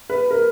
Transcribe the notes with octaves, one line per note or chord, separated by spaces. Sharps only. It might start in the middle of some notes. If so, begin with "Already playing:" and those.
B4
A#4